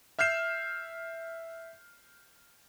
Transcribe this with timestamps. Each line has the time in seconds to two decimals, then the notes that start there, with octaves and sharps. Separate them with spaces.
0.19 E5 F6 G6 C7 E7